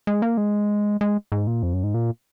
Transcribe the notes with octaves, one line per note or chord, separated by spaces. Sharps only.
G#3
A#3
G#3
G#3
G#2
A#2
F2
F#2
G#2
A#2